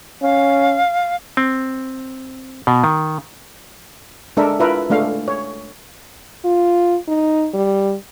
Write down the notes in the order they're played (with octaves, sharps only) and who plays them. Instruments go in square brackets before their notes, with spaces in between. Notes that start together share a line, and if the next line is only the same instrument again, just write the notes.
[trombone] C#4 [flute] F5
[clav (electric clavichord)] C4
B2
D#3
[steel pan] G#3 D4 A4 A#4 E5
E4 F4 A#4 B4 E5
G#3 A3 D4 F5
C#5
[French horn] F4
D#4
G3